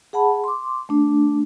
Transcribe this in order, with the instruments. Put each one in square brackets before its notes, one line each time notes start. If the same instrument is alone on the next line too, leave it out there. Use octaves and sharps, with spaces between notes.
[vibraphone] G#4 F#5 A5 B5
C6 D6
A3 D4